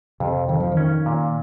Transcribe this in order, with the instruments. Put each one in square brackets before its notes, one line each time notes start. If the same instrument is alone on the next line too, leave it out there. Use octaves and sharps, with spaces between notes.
[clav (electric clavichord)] F2 [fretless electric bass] C3
[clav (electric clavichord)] F2 [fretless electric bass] D#3
[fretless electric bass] F3
D#3
[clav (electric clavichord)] C#4
A#2